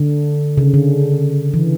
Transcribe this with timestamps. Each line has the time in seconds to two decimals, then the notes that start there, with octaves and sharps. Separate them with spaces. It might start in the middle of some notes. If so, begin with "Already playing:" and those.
Already playing: D3
0.57 C#3
0.74 D3
1.54 E3